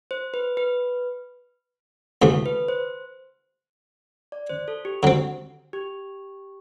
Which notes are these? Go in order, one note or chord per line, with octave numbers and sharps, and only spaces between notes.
C5
B4
B4
D2 C3 E3 A3 A4
B4
C5
D5
C5
A4
G4
D3 F#3 C4
G4